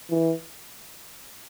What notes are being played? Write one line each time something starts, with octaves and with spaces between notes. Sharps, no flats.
E3